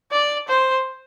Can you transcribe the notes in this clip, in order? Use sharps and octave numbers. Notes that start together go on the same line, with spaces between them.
D5
C5